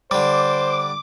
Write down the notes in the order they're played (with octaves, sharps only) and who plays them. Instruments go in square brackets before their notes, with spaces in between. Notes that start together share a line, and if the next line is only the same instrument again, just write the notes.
[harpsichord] D3 G3 [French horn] C5 [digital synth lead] D6